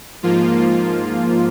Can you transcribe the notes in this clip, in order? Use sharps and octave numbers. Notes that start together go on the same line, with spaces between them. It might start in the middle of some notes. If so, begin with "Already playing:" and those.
G#2 F3 A#3 F4